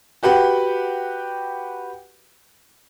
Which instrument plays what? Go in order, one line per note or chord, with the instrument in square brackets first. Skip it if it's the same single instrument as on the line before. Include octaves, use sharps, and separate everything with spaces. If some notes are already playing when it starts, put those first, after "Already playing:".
[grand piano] F#4 G4 B4 F#5 G5